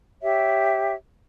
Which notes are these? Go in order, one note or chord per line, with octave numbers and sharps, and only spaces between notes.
G4 C#5 E5